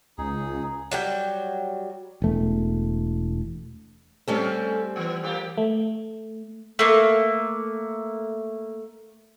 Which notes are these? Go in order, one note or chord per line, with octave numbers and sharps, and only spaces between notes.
C#2 D#4 G#4
F#3 G3 G5
E1 A3
G3 A3 C4 C#4 G4 A4
E3 B3
E3 A#3 G4
A3
A3 A#3